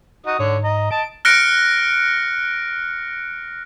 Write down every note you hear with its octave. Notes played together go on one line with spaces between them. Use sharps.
D#4 F#4 D#6
G#2 D3 C#5
D#5 A#5
D#5 A5 D7
F6 F#6 A#6 C#7 D7